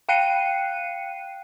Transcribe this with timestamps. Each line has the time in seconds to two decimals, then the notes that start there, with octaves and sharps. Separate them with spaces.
0.09 F5 G5 F#6 C7 C#7 D#7